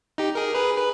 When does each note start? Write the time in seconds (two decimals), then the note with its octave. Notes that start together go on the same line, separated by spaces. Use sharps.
0.18 D#4 G4
0.35 G#4 A#4
0.55 G#4 B4
0.77 B4